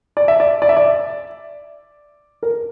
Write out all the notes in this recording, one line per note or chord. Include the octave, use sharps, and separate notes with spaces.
D5
E5
D5
D5
E5
D5
A#4